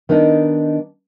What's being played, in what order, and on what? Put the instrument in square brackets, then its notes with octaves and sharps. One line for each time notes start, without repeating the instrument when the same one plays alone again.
[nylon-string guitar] D#3 B3 D4 D#4 D#5